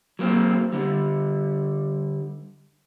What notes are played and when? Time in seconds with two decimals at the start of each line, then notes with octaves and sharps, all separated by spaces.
0.19 F#3 A#3 C4
0.73 D3 G3